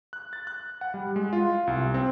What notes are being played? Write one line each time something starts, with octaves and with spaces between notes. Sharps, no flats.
F#6
A6
F#6
F#5
G3
G#3
F4
C2
C4